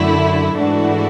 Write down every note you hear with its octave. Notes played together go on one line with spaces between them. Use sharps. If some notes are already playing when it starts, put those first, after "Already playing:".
Already playing: F#2 D3 A3 E4
G#2 E3 A3 D4 F#4